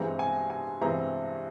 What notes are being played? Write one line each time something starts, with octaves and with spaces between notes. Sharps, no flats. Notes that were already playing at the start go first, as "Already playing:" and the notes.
Already playing: G2 E3 G#3 C4 A#5
G#5
G#5
G2 E3 G#3 C4 A#5